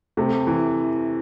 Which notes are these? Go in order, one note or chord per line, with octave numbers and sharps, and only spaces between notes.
C3 A3
E3